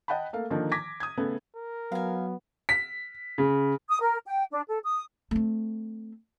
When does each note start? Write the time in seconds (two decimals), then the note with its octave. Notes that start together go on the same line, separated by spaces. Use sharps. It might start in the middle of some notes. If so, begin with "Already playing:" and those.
0.08 D#5 F#5 G5 A5 B5
0.33 A3 A#3 F5
0.50 D3 D#3 F3 A#3
0.72 D6 G#6 A#6 B6
1.00 D#6 G#6
1.17 C#3 A3 B3
1.55 A#4
1.92 F#3 B3 F5 G#5
2.69 B6
3.38 C#3
3.89 D#6
4.02 A#4
4.26 G5
4.51 D4
4.67 A4
4.84 D#6
5.31 A3 C4